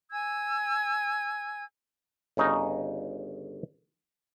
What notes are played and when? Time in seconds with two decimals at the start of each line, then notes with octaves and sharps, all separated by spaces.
0.11 G#5 E6 G#6
2.37 G1 C#3 D#4 D#5